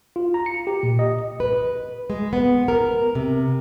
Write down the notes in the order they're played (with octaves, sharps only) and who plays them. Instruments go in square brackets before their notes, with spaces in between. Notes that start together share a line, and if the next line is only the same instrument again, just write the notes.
[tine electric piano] F4
A#5
C#7
G4
A#2
D#5
[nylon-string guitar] B4
G#3
B3
A#4
C3